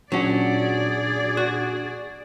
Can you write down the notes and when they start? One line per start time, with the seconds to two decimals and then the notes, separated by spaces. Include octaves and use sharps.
0.12 A#2 F#3 C#4 D4 G#4 D5 F#5
1.37 F#4